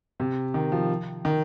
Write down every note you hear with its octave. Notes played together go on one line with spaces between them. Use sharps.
C3
D#3
F3
D#3